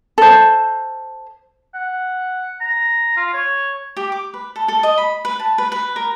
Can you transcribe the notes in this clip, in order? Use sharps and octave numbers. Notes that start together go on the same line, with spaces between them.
A4 C5
F#5
A#5
F4
C#5
G4
D6
B4
A4
A4
D#5
B5
B4
A5
B4
B4
A#4